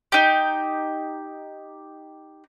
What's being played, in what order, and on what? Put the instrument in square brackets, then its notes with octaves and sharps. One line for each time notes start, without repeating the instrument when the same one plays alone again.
[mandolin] D#4 G4